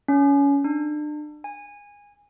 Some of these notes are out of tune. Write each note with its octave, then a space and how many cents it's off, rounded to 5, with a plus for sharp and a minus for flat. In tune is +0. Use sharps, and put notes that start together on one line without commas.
C#4 +25
D4 +35
G#5 -20